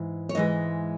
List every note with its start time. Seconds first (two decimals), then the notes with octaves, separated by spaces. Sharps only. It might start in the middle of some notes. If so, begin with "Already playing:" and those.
Already playing: G#2 E3
0.29 C#5
0.35 G#2 E3 G#3 D#5